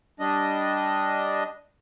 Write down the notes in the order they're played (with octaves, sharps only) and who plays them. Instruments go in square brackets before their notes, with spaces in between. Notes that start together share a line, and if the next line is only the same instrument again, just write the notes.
[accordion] G3 D4 D#5